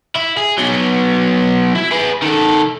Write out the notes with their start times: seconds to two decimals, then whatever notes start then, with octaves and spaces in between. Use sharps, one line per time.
0.16 E4
0.37 G#4
0.58 F#3 B3
1.75 E4
1.91 G#4 B4
2.22 D#3 A4